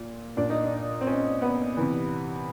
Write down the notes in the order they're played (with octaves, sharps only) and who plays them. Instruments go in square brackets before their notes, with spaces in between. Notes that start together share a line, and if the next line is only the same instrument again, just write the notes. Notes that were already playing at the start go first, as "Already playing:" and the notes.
Already playing: [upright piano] A#2
A#2 D4
D#4
D4
C4
C#4
B3
C3 E3